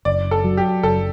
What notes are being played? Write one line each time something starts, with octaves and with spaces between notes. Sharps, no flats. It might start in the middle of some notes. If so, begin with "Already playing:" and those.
F#1 D5
A4
F#3
G4
F#1 A4